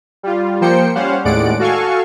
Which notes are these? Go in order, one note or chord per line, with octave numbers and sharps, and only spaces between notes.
G3 F4
F3 A#3 C5 G5 C#7
G3 C#4 C5 F5 F#5
D#2 A2 G#3 D5 F#5 D7
F#4 A4 F5 G#5 C#6